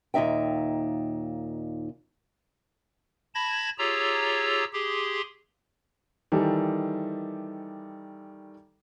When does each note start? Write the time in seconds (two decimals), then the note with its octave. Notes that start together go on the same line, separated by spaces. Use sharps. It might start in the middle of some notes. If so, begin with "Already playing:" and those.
0.14 D#2 A#2 D#4 E5 G5
3.35 A5 B5 G#6 A#6
3.78 F4 G4 G#4 C#5 A#5 E6
4.73 G4 G#4 C6
6.32 D#3 E3 G3 G4 A4